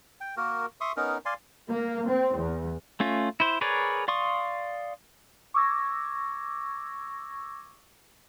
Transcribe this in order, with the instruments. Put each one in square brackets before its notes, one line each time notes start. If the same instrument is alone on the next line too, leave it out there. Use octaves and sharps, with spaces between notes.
[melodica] G5
A#3 F#4 A#4
E5 C6 C#6 D#6
B3 C#4 D#4 A#4
D5 F5 G#5 C6
[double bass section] A#3
C4
E2
[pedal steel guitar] A3 C#4 F4
E4 C5
G#4 A#4 B4 C#5 D5
D5 F5 C6 C#6 D#6
[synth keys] C#6 D6 E6 G#6 A#6